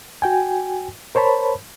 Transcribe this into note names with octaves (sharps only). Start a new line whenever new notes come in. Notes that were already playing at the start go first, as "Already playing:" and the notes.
F#4 G5 G#5
A#4 C5 C#5 A5 B5